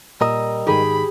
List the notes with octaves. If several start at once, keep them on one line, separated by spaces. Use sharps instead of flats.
A#2 G3 A#4 D#5 E6
G#2 D#3 D#4 G4 G#4 B5